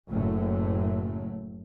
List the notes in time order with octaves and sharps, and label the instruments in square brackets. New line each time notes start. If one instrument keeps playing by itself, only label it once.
[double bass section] F#1 F#2 A2 F#3 A3